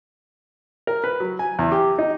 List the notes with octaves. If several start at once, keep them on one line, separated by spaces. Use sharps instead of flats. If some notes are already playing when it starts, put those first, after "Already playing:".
A#4
B4
F#3
G#5
E2
G4
D#4